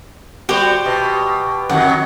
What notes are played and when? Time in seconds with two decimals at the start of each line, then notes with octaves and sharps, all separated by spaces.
0.49 G3 F#4 G4 C5
0.85 B2
1.70 F2 D#3 F#3 F#5